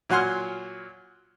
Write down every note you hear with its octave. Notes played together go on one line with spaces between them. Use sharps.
A#2 F#3 F#5 G#5 C6 F6